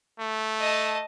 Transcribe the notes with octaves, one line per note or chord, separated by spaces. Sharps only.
A3
D#5 A5